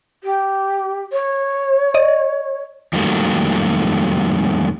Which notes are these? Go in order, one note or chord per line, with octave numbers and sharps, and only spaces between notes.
G4
C#5
D5 D#5
F2 D#3 F#3 G3 A3 A#3